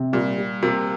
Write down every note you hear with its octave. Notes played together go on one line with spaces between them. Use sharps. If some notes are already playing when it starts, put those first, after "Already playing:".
Already playing: C3
A#2 G3
G3
C3 A#3